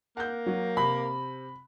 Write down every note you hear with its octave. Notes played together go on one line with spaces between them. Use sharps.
A#3 F#5 G6
F#3
C3 B5